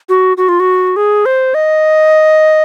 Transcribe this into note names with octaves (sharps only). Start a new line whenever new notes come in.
F#4
F#4
F4
F#4
G#4
C5
D#5